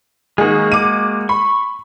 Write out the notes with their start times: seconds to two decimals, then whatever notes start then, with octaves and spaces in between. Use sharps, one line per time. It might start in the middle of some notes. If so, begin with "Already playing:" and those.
0.38 D#3 G#3 A#3 F#4 G#4
0.72 D6 D#7
1.29 B5 C#6